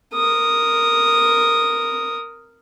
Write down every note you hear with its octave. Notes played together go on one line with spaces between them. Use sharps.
A#4 D#6